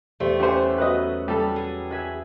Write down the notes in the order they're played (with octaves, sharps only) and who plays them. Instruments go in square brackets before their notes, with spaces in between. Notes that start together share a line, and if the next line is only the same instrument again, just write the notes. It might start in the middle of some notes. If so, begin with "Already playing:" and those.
[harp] E2 C5 [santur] G3 [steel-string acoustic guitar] A3
[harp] C#4 [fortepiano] G4 C5 [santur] F#5
[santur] F#3 B3 E5 [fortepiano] B4 D#5
[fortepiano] G3 A4
[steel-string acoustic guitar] G#4
[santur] E5 G#5 [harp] F#6 G#6 B6